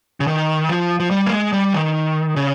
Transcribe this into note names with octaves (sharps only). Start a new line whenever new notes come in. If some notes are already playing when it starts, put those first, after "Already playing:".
C#3
D#3
F3
F3
G3
A#3
G#3
G3
D#3
C#3